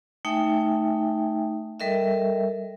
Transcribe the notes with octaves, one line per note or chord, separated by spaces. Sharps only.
A3 D#4 E5 G5 G#5
G3 A4 A#4 D#5 E5